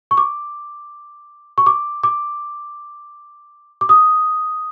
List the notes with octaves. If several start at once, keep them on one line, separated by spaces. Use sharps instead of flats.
C#6
D6
C#6
D6
D6
D6
D#6